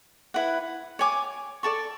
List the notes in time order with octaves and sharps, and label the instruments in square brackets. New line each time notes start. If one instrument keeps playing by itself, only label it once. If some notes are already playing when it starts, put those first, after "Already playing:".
[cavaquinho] E4 B4 F#5
C#5 G#5 D6
A4 D5 A5 C#6